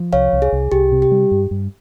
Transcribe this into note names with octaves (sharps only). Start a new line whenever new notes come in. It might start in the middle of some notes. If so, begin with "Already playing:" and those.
Already playing: F3
C2 C#5 F5
C2
G#4
C2
C2 G4
C3
G4
G3
G2
G2